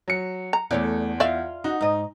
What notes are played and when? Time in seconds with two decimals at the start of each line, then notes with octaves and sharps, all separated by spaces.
0.08 F#3 C#7
0.53 A#5
0.71 E2 A3 C#5 D5
1.20 F4 D5 E5 F5
1.64 D#4 F#4
1.81 G#2 D#5